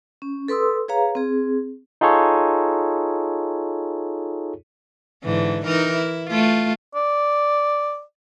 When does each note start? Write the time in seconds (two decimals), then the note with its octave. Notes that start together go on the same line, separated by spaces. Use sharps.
0.22 C#4
0.48 A4 B4 C6 D#6 E6
0.88 G#4 B4 C#5 F5 A#5
1.15 C4 G#4
2.01 D#4 F4 G#4 A4 C#5
5.24 G#2 D3 E3
5.66 E3 D#4 A#4
5.97 E4
6.30 A3 F4
6.95 D5